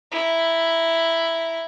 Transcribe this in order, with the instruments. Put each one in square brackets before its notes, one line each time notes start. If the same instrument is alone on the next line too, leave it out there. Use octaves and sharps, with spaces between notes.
[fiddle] E4 A#5